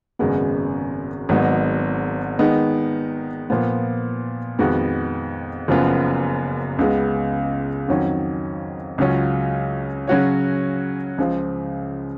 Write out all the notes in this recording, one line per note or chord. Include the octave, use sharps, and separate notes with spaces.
G#1 F#2 C#3 G#3 B3
G#1 G#2 F#3 B3 D#4
D#3 G#3 B3 D#4
A#2 F3 B3
F2 D#3 G#3 B3 F#4
F#1 F#2 F3 B3 F4
C#2 C#3 G#3 B3
F2 D#3 F#3 C#4
C#2 C#3 F#3 C#4 F4
C#3 F#3 C#4 F#4 C#5
C#2 C#3 F3